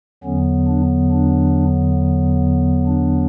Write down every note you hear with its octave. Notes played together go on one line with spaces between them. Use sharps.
E2 D3 F#3 B3 C#4
D4
D4
D4